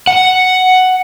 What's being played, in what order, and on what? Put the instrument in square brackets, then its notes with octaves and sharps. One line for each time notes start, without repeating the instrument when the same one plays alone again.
[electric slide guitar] F#5